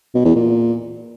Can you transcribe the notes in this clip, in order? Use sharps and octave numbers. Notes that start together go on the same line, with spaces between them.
B2
E2
A#2